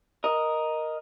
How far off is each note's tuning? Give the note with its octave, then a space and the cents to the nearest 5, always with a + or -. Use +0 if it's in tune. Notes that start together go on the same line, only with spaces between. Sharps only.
A#4 +5 D#5 +0